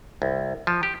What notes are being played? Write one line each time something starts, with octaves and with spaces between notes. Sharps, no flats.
C2
F3
G4